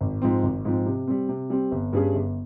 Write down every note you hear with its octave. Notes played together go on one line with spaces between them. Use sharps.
G#1
G#2 F3 C4
G#1
G#2 F3 C4
C3
G3 C4
C3
G3 C4
G1
G2 G3 C#4 G#4
G1